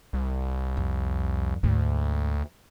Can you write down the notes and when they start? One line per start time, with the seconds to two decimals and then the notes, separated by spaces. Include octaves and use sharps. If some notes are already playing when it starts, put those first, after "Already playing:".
0.13 C2
0.77 F2
1.63 D2 G#2 D3